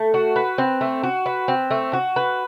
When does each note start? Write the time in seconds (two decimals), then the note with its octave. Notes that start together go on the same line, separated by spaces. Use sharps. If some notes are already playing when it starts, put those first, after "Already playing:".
Already playing: A3
0.14 F#4
0.36 B4
0.58 C4
0.81 A3
1.03 F#4
1.26 B4
1.48 C4
1.71 A3
1.93 F#4
2.16 B4